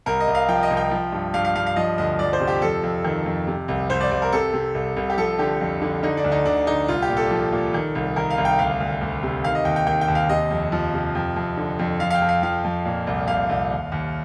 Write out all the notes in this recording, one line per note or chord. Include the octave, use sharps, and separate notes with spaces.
C2 A#4
D#5
C2
F5
F3 G5
D#5
C2
G5
F3
G2
G2 F5
F5
G2 F5
F5
F3 D#5
D2 D#5
F3 D5
C5
C3
G4
F2 A4
F2
D#3
F2
C3
C2
C2 C5
D5
C2 D5
A#4
C3 A4
C3
C2
C2
G4
F3 A4
D3 G4
F2
D3
D3 D#4
D4
D2
D#4
D2 D4
D3 D#4
C2 F4
G4
A#2
A4
F3
A#2
D#3
C2
D#3 A#4
F5
C2
G5
D2 F5
D2
D2
C3
D#3 F5
D#5
D#2 G5
G5
D#3 G5
G5
D#2
F5
C3 D#5
F2
F3
C3
F2
F2
D3
F2
F3 F5
F5
G5
F2
F5
F3 F5
F2
A#2
C2
C2 F5
C2
D#2
D#2